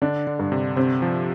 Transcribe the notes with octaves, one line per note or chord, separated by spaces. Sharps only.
D3 D4
D3
G2
C3
C3 C4
F3